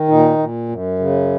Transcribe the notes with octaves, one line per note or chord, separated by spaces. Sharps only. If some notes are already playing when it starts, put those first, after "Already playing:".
Already playing: D#3
A#2 D#4
A#2
F#2
C#3